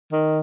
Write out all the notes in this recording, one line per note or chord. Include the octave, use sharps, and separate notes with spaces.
D#3